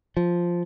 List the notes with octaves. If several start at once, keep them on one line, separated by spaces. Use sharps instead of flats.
F3